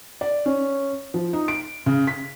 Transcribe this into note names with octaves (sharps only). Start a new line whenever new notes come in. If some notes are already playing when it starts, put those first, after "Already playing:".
D5
C#4
F3
D#4
D7
C#3
B6